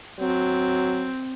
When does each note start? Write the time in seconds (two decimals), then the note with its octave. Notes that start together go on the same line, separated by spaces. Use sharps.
0.20 F#3 C4